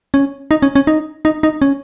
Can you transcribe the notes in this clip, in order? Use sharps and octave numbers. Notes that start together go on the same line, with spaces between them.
C#4
D#4
C#4
C#4
D#4
D#4
D#4
C#4